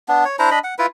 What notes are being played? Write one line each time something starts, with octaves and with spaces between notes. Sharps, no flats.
B3 D4
C#5
D4 E4 C5 A#5
D4 D#5 B5
F#5
E4 F4 B4